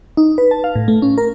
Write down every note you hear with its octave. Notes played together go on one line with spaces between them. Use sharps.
D#4
B4
A5
F5
A2
A3
C#4
A#4